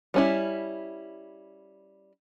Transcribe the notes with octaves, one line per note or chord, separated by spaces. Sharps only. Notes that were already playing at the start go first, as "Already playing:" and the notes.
G3 C#4 E4